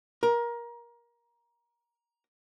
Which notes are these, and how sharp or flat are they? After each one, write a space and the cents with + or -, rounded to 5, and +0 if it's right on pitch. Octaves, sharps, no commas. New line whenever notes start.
A#4 +20